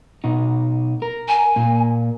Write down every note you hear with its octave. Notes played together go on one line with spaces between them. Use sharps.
B2 D#4
A#4
G#5
A#2 A#3